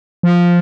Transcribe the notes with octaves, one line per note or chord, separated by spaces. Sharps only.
F3